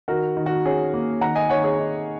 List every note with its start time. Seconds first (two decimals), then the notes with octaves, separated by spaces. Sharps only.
0.08 D#3 F#4 A#4
0.37 D#3
0.46 F#4
0.65 C#4 G#4
0.94 A#3
1.21 D#3 F#5 A#5
1.35 D#5 G#5
1.49 D#3 C#5 F#5
1.64 G#4 C#5
1.78 D#4